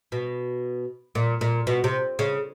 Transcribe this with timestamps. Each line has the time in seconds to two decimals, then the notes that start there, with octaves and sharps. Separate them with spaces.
0.12 B2
1.15 A#2
1.41 A#2
1.67 B2
1.84 C3
2.19 C#3